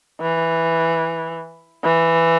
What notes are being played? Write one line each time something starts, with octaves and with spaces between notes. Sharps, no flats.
E3
E3